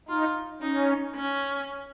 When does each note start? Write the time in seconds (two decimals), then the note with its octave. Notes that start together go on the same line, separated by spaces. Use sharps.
0.08 D#4 F4
0.61 C#4 D#4
1.15 C#4